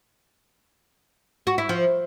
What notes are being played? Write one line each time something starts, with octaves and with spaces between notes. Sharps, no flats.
F#4
E4
F3